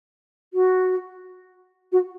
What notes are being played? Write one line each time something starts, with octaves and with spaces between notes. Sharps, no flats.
F#4
F#4